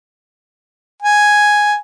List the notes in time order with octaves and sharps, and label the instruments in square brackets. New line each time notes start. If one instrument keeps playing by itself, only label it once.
[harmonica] G#5